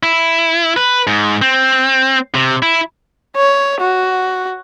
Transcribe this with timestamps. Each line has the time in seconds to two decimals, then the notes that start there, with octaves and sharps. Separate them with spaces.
0.03 E4
0.77 B4
1.07 G#2
1.42 C4
2.35 C3
2.62 E4
3.36 C#5
3.81 F#4